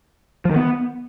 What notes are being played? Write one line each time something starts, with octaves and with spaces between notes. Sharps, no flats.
F3
D#3
B3